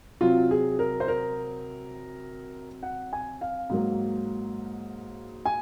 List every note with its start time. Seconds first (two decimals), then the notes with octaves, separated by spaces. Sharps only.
0.21 C3 F#3 C4 F4
0.51 G#4
0.79 A#4
1.00 C5
1.08 A#4
2.83 F#5
3.13 G#5
3.41 F5
3.70 G#2 F#3 A#3
5.46 G#5